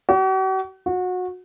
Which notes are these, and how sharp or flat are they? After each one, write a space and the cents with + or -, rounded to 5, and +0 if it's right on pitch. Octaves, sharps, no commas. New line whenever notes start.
F#4 +45
F#4 -25